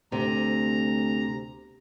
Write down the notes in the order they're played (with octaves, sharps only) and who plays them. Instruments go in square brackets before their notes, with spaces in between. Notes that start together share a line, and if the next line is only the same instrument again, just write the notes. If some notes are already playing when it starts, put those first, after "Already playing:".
[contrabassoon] D2 [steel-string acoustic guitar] C3 [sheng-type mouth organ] A#5